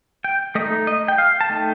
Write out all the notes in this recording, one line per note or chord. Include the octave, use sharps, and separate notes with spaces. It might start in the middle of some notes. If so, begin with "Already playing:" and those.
G5
A3 D#4 D#5
D#5
G5
F5
A5
A3 D#4 G5